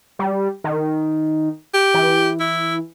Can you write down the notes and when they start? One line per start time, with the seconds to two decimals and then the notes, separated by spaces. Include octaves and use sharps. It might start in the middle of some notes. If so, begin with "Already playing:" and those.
0.19 G3
0.64 D#3
1.74 G4
1.94 E3
2.40 E4